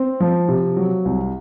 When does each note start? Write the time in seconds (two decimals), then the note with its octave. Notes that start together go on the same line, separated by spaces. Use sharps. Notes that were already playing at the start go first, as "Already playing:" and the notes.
Already playing: C4
0.20 F3
0.49 C3
0.77 F#3
1.05 C2